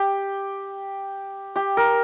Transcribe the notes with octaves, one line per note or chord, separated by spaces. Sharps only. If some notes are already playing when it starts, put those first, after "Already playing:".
Already playing: G4
G4
A#4